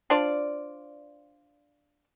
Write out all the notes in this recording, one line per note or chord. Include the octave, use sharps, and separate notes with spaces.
D4 F4 C5 D5